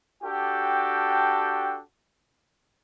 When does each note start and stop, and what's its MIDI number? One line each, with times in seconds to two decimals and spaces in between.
0.24 1.79 62
0.24 1.79 66
0.24 1.79 67
0.24 1.79 69
0.24 1.79 79